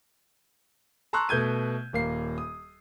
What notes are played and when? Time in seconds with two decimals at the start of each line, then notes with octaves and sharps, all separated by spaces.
1.13 A5 A#5 C6 C#6 E6 F#6
1.29 B2 A3 G6 G#6 D#7
1.93 D#1 A#3 C7
2.38 D#6